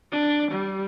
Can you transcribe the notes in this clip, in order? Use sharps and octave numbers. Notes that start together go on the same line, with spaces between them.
D4
G3